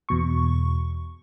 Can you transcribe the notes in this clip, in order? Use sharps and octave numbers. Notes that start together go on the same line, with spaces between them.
E2 B2 C#6